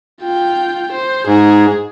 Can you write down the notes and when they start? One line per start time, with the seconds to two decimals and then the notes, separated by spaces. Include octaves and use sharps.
0.22 F4 G5
0.92 C5
1.27 G#2 G#4